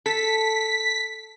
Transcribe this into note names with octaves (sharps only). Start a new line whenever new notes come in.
A4 B6